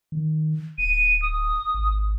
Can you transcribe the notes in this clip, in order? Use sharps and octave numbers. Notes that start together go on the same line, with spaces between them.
D#3
D1 D#7
D#6
G#1